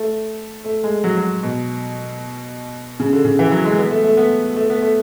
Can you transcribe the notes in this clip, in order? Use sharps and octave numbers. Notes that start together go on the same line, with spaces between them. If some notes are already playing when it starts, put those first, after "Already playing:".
Already playing: A3
A3
G#3
F#3
F#3
B2
C#3
D3
C#3
E3
F#3
G#3
B3
A3
A3
B3
A3
B3
A3